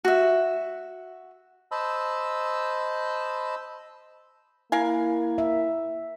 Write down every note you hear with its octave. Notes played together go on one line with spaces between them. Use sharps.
F#4 E5
C5 D#5 A5 B5 E6
A#3 E4 A#4 F5 G#5
E5